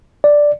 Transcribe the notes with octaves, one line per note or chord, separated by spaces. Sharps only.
D5